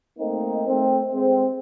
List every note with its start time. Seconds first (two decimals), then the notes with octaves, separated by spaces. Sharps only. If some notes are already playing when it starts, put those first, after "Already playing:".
0.19 A3 A#3 C4 D#4
0.68 A3 C4
1.13 G#3 C4